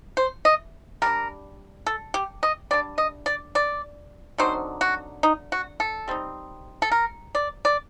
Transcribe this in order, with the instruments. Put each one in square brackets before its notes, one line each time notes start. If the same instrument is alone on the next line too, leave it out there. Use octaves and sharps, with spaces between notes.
[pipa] C5
D#5
G3 D4 A#4
A4
G4
D#5
G3 D4 D5
D#5
D5
D5
D3 F#3 C4 D#4 C5
F#4
D#4
F#4
A4
G3 C4 D#4
A4
A#4
D5
D5